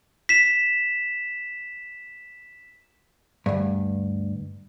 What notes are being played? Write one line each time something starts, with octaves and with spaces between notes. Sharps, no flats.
B6 E7
D2 G2